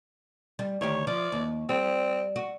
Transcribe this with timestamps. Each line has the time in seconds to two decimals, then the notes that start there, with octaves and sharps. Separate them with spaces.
0.59 G3
0.81 D2 D#3 G4 C#5
1.07 F3 D5
1.32 D#2
1.69 G3 C4
2.36 F#4